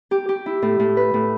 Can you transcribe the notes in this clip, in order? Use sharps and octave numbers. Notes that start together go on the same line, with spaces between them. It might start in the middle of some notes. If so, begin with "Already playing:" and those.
G4
G4
E4
A2
A2
B4
A2